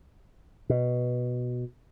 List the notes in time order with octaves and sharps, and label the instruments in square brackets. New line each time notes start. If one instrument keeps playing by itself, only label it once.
[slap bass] B2